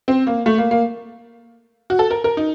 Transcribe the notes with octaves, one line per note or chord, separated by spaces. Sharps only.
C4
A#3
A3
A#3
A#3
F#4
A4
A#4
A#4
D#4